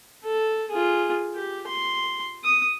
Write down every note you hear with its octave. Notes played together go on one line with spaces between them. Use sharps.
A4
F4 G#4
G4
C6
D#6